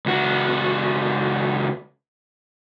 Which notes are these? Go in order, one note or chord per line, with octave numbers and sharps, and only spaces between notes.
C#2 F#4